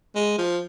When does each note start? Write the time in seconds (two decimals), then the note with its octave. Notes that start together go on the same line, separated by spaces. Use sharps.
0.15 G#3
0.38 F3